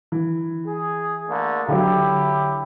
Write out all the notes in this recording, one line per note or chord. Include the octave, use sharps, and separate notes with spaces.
E3
G#4
D3 A3 A#3
D3 F#3 E4 G4